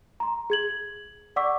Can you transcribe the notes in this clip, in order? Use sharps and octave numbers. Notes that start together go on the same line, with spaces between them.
A#5 C6
G#4 G#6 F#7
D5 F#5 C#6 D6 E6 B6